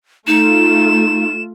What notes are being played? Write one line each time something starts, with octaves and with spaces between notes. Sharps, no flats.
A3 D#4 F4 E7